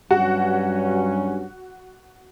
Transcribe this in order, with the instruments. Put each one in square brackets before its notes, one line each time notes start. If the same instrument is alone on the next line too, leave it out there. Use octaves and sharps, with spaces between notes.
[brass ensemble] G2 F#3 C#4 [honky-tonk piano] F#4